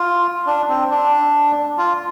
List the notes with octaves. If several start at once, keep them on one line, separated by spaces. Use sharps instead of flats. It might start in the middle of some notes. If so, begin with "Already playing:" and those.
Already playing: F4
D4
C4
D4
F4